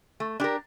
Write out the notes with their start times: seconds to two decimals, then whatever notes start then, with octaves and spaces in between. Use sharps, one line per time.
0.20 A3
0.40 D4 G4 A#4